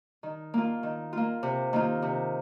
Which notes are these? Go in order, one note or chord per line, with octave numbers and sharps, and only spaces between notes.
D#3
A#3 F4
D#3
A#3 F4
C3
D#3 A#3 F4
C3